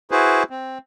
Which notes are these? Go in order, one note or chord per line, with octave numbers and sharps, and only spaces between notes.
E4 F#4 G#4 B4 C5
C4